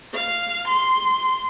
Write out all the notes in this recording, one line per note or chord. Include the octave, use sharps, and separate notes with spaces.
F5
C6